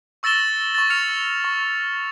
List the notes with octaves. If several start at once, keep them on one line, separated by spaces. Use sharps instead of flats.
C#6 E6 A6 A#6 E7 G7
C#6 A6
F6 C#7 F7
C#6